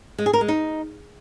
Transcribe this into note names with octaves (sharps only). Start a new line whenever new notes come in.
G#3
G#4
A#4
G#3
D#4